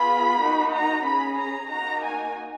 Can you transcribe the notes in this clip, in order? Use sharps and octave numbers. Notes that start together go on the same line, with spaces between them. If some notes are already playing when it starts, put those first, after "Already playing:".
Already playing: B3 F4 G#4 B5
A#3 D#4 F#4
A#5
C#4 G#4 B5
A#5
A#3 D#4 F#4 A#5
G#5